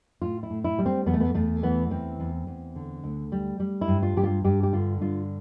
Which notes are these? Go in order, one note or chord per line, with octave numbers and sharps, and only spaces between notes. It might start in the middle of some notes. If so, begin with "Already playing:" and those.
A2 F4
E4
A2
E4
G3
C4
E2 B3
A3
B3
E2 A3
E3 B3
E2 C4
E2
E2
D3
D2
G3
G3
E4
G2
F4
G2 G4
F4
G2 G4
G4
D3 F4
G2 F4